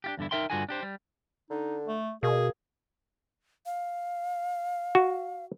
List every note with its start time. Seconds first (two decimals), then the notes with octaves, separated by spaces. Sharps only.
0.04 D4 F4 G4
0.17 E2 G2 D3 E4
0.31 D#4 F4 A#4 E5 G5 C6
0.50 G2 D3 F4 F#4 G#4 G#5
0.69 D4 G4 C5
0.83 G3
1.50 D3 D#4
1.88 A3
2.23 B2 A#3 G#4
3.66 F5
4.95 F#4